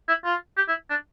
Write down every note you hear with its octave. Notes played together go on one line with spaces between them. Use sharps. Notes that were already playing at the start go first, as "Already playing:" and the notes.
E4
F4
G4
E4
D4